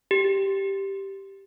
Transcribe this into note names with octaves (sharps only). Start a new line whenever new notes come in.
G4